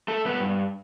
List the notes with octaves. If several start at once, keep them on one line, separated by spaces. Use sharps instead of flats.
A3 A4
G2 B3 B4